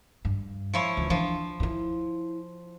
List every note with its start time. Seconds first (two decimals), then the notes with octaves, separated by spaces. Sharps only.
0.25 G2
0.73 F3 E4 C#5
0.97 C#2 E3
1.10 E3 F3 D4
1.60 G2 E4